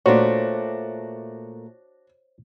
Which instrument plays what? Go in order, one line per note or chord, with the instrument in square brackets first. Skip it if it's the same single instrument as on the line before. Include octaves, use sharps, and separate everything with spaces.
[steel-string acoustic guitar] A#2 A3 [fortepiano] D4 F#4 [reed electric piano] C5 C#5